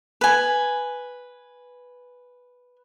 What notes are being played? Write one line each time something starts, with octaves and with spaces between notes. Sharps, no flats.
B4 G#5